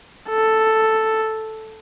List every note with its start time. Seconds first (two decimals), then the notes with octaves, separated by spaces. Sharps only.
0.30 A4